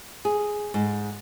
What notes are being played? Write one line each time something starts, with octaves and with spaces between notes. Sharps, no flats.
G#4
G#2